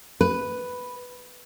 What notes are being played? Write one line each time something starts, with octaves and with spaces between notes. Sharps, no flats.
B4